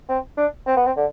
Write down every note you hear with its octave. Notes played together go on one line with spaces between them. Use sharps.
C4
D4
C4
B3
C4
D3